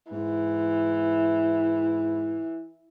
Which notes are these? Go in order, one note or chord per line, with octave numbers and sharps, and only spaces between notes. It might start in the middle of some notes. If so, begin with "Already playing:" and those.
G#2 E3